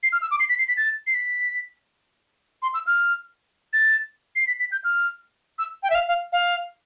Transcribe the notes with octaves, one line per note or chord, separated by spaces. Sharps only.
C7
F6
E6
D6
C7
B6
C7
B6
A6
C7
B6
C6
E6
F6
A6
C7
B6
B6
G6
F6
E6
G5
E5
F5
F5
F5